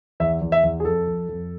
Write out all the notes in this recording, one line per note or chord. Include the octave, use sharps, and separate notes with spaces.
E2 E5
E2
E5
E2
G#4
F2 A4
F2
F2